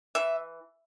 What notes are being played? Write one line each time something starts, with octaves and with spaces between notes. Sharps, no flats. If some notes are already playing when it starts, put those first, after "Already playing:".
E3 E5